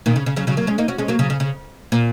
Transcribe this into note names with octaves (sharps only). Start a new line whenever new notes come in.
A#2 D#3
C#3
C#3
C#3 F#3
C#3 F#3
F#3 A#3
G#3 C#4
A#3 D#4
C#4 F#4
G#3 C#4
F#3 A#3
C#3 F#3
C#3
C#3
A#2